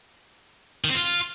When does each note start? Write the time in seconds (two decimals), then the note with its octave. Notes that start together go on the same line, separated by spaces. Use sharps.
0.84 D#3
0.90 C4
0.95 F4